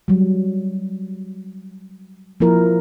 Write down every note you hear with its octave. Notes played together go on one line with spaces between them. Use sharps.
F#3 G3
F3 A#3 E4 A#4